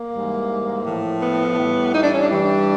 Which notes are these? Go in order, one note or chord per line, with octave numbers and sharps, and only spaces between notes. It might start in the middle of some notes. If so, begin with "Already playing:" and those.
Already playing: A#3
G#2 E3 G3
A2 F3
B3
A2 E3 G3
D#4
D4
C#4
D4
G2 E3 G3